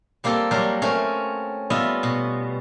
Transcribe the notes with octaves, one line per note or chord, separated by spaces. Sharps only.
G3 A#3 C4 G4 A4
F#3 G3 A#4 C5 D5
A3 C4 C#4 A#4
G3 B3 F4 D#5 E5
B2